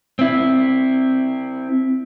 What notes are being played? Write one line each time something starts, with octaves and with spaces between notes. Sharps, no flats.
C4 E4